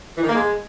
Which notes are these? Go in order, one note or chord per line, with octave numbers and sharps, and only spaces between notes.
E3
D#3
A#3
G#3